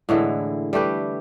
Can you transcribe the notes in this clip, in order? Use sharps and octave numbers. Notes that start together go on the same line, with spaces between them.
A2 D3 E3 G#3
G3 A3 G4 B4